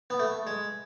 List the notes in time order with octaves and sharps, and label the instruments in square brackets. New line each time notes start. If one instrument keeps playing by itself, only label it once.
[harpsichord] B3
A3
G#3